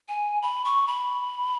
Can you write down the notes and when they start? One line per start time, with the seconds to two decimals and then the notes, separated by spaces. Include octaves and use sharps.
0.09 G#5
0.42 B5
0.65 C#6
0.87 B5